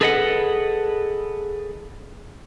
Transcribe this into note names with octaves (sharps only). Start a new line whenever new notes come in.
G#4 A4 B4 D#5 F5 F#5